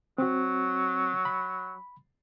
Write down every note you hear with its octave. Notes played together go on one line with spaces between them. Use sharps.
F#3 C4 F#4
B5